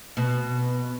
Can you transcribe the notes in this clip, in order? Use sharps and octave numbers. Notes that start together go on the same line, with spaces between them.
B2